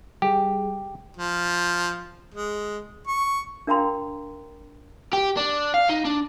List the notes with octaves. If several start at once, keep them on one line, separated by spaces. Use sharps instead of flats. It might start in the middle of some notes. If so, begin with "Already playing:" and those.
G3 G4 G#4
F3
G#3
C#6
D4 A#4 F5 G5 A#5 C6
G4
D4
F5
D#4
D4